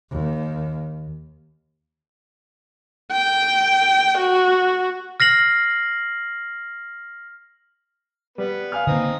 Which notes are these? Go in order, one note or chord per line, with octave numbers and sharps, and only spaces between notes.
D#2
G5
F#4
F6 A#6 C7 F#7
G3 B3 B4
F5 G#5 F6
D3 A#3 C4 D#4 D#6